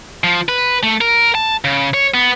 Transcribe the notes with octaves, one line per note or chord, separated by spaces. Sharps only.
F3
B4
A3
A#4
A5
C#3
C#5
B3